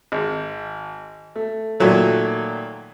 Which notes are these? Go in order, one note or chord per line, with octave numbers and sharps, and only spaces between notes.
G#1
A3
A#2 D#3 F#3 A3